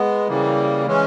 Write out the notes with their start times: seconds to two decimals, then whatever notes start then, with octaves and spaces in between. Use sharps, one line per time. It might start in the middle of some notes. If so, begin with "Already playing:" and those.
Already playing: G#3 B3
0.28 C#3 E3 G3 A#3
0.86 E3 G#3 C#4